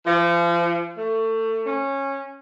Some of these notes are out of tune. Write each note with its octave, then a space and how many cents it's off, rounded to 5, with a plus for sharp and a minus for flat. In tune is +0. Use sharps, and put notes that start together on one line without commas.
F3 -35
A3 +25
C#4 -15